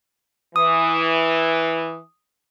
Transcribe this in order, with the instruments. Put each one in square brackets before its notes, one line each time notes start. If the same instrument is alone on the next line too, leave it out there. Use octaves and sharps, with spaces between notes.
[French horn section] E3 [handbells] D#6